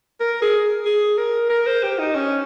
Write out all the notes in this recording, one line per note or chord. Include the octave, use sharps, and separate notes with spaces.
A#4
G#4
G#4
A#4
A#4
C5
G4
D#4
C#4